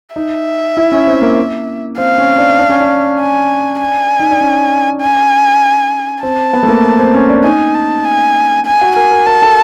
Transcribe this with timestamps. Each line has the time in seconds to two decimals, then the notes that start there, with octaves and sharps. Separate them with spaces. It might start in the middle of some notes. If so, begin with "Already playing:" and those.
0.16 D#4 E5
0.77 E4
0.92 C#4
1.07 C4
1.22 A#3
1.98 C4 F5
2.18 C#4
2.38 D4
2.59 D4
2.69 C#4
2.80 D4
3.20 G#5
3.80 G#5
4.20 D#4
4.31 D4
4.41 C#4
5.01 G#5
6.23 C4 A5
6.53 B3
6.63 A3
6.68 A#3
6.99 C4
7.14 C#4
7.29 D4
7.44 D#4 G#5
7.75 A5
8.05 G#5
8.66 G#5
8.81 F#4
8.96 A#4 G#5
9.11 A#4
9.26 A#4 A5
9.42 A4